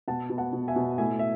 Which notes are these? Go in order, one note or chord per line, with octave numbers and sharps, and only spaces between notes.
B2 F#5 A5
B2
F#5 A5
B2
E5 G#5
B2
A2 E5 G#5
E5